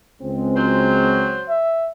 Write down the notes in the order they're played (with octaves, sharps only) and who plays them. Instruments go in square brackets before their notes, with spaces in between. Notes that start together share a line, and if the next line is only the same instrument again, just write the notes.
[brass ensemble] C#2 G#3 C4
[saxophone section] F#3 C5
[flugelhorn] E5